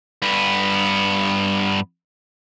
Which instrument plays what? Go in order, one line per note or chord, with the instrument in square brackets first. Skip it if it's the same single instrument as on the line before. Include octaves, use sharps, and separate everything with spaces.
[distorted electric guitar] G2 B3